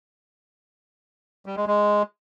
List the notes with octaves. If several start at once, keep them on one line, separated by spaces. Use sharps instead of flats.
G3
G#3
G#3